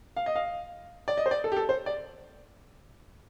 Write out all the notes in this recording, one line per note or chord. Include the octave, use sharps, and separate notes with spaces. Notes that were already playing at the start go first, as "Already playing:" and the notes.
F5
D#5
F5
D5
D#5
C5
D5
A4
G4
A4
C5
D5